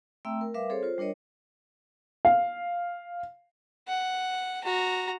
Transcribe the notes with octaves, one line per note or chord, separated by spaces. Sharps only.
A3 C4 E5 G5 A#5 E6
A#4
G3 A#4 B4 E5 F5 D6
C4 G#4 A4 C5 C#5
F4 C5
G3 D4 A#4 C#5 D#5
F5
F#5
F#4 A#5